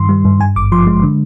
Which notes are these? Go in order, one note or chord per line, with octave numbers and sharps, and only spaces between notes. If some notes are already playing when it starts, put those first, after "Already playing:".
Already playing: G2 D#3 C6
G3
G2
G2 G#5
G#1 D6
F3 C6
G#3
D3